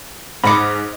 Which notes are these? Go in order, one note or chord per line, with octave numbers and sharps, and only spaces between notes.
G#2 C#5 D#5 B5 D6 C#7